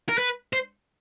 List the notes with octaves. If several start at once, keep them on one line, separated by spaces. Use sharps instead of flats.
A#4
B4
C5